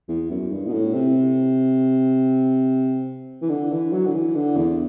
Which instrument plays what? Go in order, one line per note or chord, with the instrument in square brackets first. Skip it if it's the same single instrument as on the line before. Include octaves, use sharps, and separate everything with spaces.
[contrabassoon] E2
F#2
G2
B2
A2
C3
E3
D3
E3
F#3
D3
E3
D3
E2